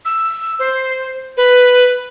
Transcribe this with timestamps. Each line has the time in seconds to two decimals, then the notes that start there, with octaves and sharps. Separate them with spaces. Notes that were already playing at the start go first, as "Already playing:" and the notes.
0.05 E6
0.59 C5
1.37 B4